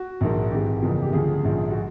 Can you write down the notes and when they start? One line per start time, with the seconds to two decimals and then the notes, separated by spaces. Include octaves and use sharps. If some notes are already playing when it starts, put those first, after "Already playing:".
Already playing: F#4
0.21 A#1 G#2 D#3
0.51 G#1 G#2 E3 G4
0.82 F#1 E2 C#3 F3
1.02 G4
1.13 D2 C#3 F3 G#4
1.44 A#1 G#2 F3
1.71 F#4